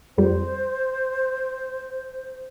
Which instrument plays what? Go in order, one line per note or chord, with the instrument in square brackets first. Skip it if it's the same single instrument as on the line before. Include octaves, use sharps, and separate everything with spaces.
[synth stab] F2 G3 [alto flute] C5